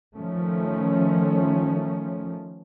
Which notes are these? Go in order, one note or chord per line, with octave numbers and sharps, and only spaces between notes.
D#3 F3 A3 C#4